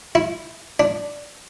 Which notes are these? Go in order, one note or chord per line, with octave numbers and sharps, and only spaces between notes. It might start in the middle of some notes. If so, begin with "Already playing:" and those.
E4
D4